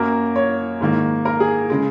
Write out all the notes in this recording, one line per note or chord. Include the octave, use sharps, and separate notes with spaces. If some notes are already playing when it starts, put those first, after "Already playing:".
Already playing: F#2 F#3 A#3 A#4
C#5
G#2 D#3 A#3
A#4
G#4
C#3 G#3